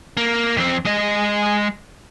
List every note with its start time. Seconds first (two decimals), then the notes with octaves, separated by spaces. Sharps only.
0.17 A#3
0.57 F2 C4
0.85 G#3 D#5